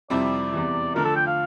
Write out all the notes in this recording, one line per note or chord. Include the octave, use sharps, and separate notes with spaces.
F2 C3 G3 C4 E4 D5
E2 C3 E3
D3 F3 A3 D4 A#4
A4
G5
F5